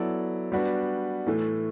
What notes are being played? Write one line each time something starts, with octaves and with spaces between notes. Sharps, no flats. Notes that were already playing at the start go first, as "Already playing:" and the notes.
Already playing: F#3 B3 E4 A4 D5
G3 B3 D4 F#4 B4
A2 E3 A3